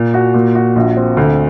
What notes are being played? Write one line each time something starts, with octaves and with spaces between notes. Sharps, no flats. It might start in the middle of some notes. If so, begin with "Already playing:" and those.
Already playing: A#2
F#4
A#2
F#4
A#1
C4
D2